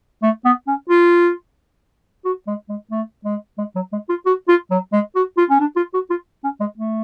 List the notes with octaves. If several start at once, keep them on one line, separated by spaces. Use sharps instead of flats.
A3
B3
C#4
F4
F#4
G#3
G#3
A3
G#3
G#3
F#3
G#3
F4
F#4
F4
F#3
G#3
F#4
F4
C#4
D4
F4
F#4
F4
C#4
G#3
A3